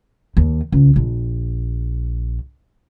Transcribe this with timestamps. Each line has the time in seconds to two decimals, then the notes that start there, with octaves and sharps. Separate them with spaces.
0.37 D#2
0.72 C#2
0.96 A#1